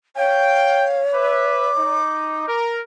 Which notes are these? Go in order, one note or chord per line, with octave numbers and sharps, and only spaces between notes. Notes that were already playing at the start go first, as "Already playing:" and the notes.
C#5 F5 G5
B4 E5 D6
D#4
A#4